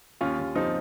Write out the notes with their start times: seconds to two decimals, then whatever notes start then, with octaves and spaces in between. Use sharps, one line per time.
0.21 D#2 C#4 F4
0.39 D#2
0.55 F3 C4 D#4